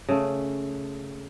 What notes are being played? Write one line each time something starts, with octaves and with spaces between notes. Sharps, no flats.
C#3 A3